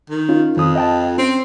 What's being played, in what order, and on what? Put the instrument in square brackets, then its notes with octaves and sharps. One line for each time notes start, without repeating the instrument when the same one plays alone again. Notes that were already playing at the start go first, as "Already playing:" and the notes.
[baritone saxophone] D#3
[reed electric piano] C#4 D#4 F4
[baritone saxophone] F2 [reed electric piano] D#3 D#6
[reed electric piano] D#5 G5 A5
[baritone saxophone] C4 [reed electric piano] C#4